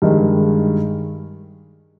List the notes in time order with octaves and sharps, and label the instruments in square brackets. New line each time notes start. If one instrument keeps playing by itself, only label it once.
[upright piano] G2 D#3 G#3